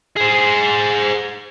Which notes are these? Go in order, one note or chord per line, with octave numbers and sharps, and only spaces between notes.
G#4 C5